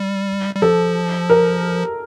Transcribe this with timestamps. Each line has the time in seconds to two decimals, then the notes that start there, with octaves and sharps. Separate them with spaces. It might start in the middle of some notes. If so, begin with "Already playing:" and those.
Already playing: G3
0.55 G3
0.62 F3 A4
1.30 A#4